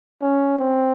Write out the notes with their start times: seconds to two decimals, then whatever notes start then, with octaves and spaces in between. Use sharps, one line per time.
0.22 C#4
0.59 C4